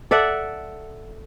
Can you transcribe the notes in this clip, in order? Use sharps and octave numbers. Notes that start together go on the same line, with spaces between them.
A4 D5 E5 F#5